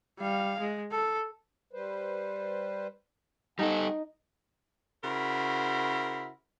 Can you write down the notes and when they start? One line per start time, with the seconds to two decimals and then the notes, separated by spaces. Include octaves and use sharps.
0.19 G3 F5
0.59 G#3
0.92 A4
1.73 G3 B4 C5
3.59 G3 C4 D#4 A4 F#5 G#5
5.04 C#3 E4 F#4 A#4 C5 B5